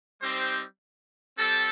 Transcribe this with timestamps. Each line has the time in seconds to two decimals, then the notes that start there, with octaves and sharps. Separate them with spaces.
0.21 G3 C4 D#4 G4 C5
1.38 G3 C4 G4 A4